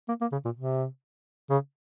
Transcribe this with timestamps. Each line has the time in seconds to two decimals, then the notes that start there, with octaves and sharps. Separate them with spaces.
0.08 A#3
0.21 A#3
0.32 C#3
0.45 A#2
0.56 C3
1.50 C#3